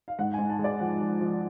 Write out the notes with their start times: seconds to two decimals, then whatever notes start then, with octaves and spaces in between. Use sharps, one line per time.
0.08 F5
0.19 G#2 F#5
0.34 G#2 G#5
0.50 A5
0.59 G#3
0.64 D5
0.80 F3 F#5
1.01 F3
1.21 F3